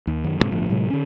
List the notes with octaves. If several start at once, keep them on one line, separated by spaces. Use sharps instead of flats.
D#2
F#2 D#3 F#3
D2 G#2 C3
G1 A2 F3
A2 C3 F#3 G#3
D3 C#4